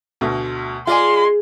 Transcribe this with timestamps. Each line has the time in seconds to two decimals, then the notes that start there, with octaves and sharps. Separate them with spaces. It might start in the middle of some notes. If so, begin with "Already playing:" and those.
0.21 D2 B2 A3
0.87 G#3 F4 D5 G#5 C6